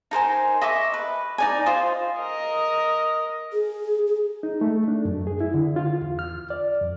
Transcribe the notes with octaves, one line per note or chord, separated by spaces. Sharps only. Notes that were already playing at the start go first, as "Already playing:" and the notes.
D#4 A#4 C5 G#5
D#5 E5 C#6 D6
B4
D#4 D5 G#5
F4 C5 D#5
A#4 D#5
G#4
G#4
D#4
A3
D4
F#2
G#4
E4
D3
F4
E2
F6
D5
F2